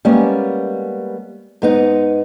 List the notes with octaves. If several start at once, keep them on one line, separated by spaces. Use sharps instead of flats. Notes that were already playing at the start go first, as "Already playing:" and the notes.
G3 G#3 A#3 B3 C#4
G#2 B3 D#4